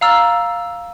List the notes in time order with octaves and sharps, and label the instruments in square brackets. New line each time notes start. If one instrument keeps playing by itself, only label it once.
[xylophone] F5 A#5 E6 F6 A6